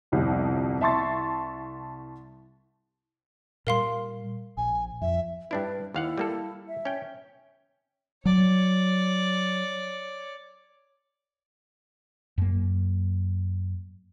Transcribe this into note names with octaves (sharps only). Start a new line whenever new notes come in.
G1 C2 F2 G3
C2 E5 A5 C6 C#6 A6
A#2 G3 A#4 F5 C6
A#1 G#5
F2 E5
G2 D4 E4 B4
D#2 E4 F5 F#5
G3 A#3 A4
E5
C#4 G5
F#3 C#5 D5
F#2 A#3